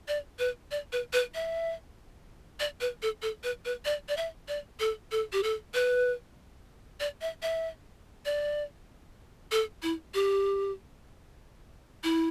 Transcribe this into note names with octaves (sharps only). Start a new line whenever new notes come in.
D5
B4
D5
B4
B4
E5
D5
B4
A4
A4
B4
B4
D5
D5
E5
D5
A4
A4
G4
A4
B4
D5
E5
E5
D5
A4
E4
G4
E4